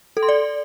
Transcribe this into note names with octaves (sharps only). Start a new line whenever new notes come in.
A4
C6
D5